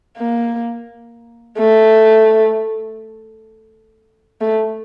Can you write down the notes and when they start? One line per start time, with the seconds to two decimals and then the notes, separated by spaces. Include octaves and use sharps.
0.17 A#3
1.58 A3
4.41 A3